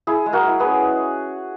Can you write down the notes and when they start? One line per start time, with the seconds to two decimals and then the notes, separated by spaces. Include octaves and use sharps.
0.07 E4 G#4
0.26 G#3
0.33 F#4 A#4
0.47 E4
0.60 G#4 B4
0.66 C#4